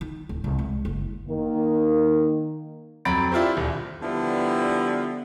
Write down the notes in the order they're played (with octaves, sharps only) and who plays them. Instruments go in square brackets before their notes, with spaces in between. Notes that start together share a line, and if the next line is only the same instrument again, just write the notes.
[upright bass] D#3
D1
C2
G#3
F#1
[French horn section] D#3 A#3
[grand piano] F2 F#3 A#5 B5 A6 D7
D4 E4 F4 G4 C5
D#1
[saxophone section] D3 F3 E4 [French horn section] G3 B3